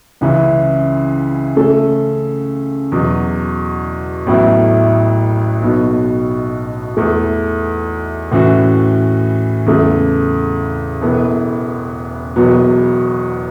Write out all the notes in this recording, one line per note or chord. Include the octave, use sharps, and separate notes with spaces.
C#2 C#3 E3 C#4 E4
C#3 A3 C#4 A4
E2 B2 F#3
A1 A2 F#3 B3 E4
B1 B2 B3
E2 E3 A3
A2 E3 C#4 F#4
E2 C#3 A3
E1 E2 E3 B3 A4
E1 E2 B2 F#3 B3